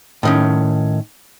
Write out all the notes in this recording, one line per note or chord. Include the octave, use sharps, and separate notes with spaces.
A2 D#3 C#4